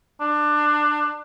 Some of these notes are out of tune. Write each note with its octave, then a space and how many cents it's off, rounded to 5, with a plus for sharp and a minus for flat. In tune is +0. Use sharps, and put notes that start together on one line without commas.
D4 +20